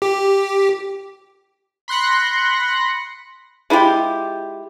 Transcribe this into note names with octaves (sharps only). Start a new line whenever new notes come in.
G4
B5 C6 F#6 A#6 C#7
G#3 E4 F4 G4